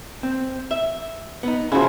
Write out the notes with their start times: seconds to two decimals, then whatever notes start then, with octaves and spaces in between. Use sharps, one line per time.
0.23 C4
0.71 E5
1.43 B3 D#4
1.72 C#3 F3 E4 F#4